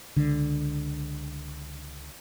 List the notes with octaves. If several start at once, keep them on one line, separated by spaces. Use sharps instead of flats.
C#2 D3